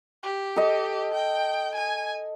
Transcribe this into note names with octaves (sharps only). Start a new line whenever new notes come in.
G4
A4 D#5
G5
G#5